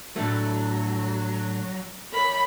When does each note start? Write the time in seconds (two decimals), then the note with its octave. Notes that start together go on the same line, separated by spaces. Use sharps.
0.16 A2 D3 F#3 A3
2.13 A#4 C#5 B5